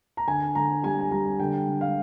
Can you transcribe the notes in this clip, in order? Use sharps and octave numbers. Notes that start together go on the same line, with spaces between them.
A#5
D3 G#5
D3 A#5
G3 G#5
G#5
G3 A#5
D3 G5
D3
F5